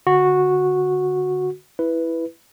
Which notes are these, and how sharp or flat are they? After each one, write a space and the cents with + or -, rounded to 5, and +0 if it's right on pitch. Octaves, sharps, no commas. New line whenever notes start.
D3 +0 F#4 -10
E4 +0 B4 +0